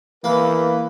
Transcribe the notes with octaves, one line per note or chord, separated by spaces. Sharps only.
E3 A#3 B4